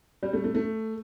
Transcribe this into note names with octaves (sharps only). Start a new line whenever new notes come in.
G3
A3
A3
A3